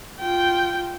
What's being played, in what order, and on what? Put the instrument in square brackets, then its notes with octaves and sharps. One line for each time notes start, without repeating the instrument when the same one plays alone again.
[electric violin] F4 G5